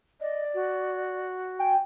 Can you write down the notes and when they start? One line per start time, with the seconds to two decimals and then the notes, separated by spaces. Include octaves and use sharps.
0.21 D5 D#5
0.54 F#4
1.59 G5 G#5